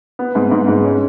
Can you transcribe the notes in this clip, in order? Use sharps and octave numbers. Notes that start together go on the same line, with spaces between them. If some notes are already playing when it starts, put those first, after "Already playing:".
B3
G#2
G#2
G#2
C#4